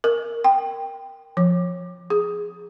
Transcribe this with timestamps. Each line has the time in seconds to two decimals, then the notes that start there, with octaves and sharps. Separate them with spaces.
0.04 A#4
0.44 G5
1.37 F3
2.10 G#4